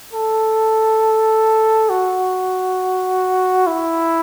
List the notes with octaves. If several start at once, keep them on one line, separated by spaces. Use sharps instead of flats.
A4
F#4
E4